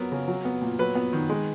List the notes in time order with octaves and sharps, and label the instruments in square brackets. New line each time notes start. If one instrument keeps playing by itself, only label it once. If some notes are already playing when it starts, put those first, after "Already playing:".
Already playing: [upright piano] F#3 B3 A#4
C#3
F#3
B3
A#2
F#3 B4
B3
D#3
G#3